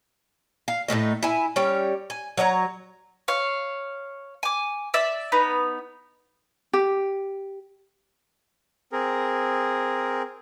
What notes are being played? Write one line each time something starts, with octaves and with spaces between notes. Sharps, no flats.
F5
A2 C#3 A3 D#4
E4 G#5
G3 C#4 C#5 G5
G#5
F#3 C#5 D#5 A#5
C#5 F5
G#5 D6
D5 E5 E6
B3 D#4 B5
G4
C4 G#4 A#4